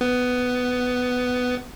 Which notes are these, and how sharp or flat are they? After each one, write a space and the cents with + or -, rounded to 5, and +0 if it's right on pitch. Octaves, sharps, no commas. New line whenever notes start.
B3 +10